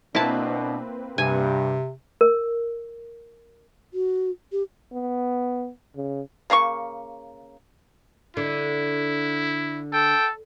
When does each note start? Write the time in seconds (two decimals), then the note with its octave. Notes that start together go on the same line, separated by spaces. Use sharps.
0.15 B2 A#3 C4 D4 E4 B4 A5
1.18 G2 C3 G#5
2.21 A#4
3.94 F#4
4.52 G4
4.92 B3
5.96 C#3
6.50 C#3 A#3 D#4 C#6
8.37 D3 E4
9.93 A4 G5